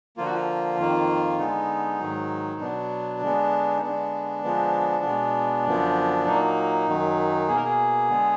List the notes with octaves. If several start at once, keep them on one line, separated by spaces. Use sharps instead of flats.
D3 F3 A#3 F4
F#4
F4
F2 D#3 A#3
D3 G#3 B3 D#4
G#2 D#3 F#3
B2 F#3 B3 D4
D3 G#3 B3
D#4
D3 G#3 B3 D4
D3 F3 G#3 B3
B2 G#3 B3
F#2 D3 F3 B3
A#2 F#3 A#3 D#4
F#2 D#3 F#3
B2 A#3 G#4
A#4
G#4
D3 G#3 B3